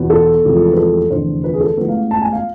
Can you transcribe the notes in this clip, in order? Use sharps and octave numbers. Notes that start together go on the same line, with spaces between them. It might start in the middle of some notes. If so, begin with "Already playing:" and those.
Already playing: E2 B2 B3
A4
F1 E2 C3 F3 G#3
B4
A4
F1 E2 D3 C5
B4
G#4
A4
A1 A2 G#3 B3 B4
F5
A5
G#5
F5